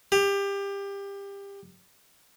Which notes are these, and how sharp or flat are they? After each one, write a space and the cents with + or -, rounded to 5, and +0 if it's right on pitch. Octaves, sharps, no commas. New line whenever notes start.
G4 +25